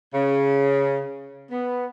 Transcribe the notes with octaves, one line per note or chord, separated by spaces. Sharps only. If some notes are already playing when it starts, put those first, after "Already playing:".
C#3
B3